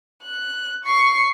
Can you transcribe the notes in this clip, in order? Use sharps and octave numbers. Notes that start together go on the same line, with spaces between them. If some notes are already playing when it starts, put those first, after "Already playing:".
F#6
C#6 C7